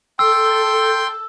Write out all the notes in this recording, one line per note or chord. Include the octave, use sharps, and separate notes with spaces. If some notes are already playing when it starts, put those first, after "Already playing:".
A4 G5 C6 E6 G6